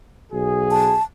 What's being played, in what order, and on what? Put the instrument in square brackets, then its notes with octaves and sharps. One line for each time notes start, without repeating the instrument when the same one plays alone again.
[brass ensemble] B1 F#4 G#4
[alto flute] A5